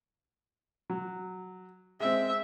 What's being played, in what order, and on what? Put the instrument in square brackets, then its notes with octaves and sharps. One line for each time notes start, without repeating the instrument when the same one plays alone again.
[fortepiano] F#3
[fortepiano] G#3 C4 [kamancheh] E5